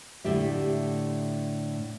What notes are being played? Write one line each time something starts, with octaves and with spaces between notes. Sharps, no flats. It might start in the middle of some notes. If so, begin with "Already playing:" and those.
A2 D3 G4 E5